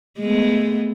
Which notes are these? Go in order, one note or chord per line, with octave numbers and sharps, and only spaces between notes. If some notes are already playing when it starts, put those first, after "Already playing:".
G#3 A3 B3